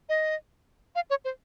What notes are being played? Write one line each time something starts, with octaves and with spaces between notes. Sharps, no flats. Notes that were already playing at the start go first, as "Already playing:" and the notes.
D#5
F5
C#5
C5